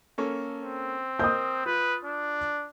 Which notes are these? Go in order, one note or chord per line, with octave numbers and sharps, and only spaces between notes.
A#3 C#4 A4
C4
A#4 C5 D#5 D#6 G6
F4 B4
D4